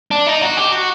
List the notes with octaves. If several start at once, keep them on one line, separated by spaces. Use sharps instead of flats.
D4
D#4
F#4
G4
F#4